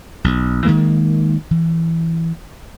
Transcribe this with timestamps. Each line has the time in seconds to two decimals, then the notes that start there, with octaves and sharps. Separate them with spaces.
0.24 B1
0.65 D#3 E3 G#3 A#3
1.51 E3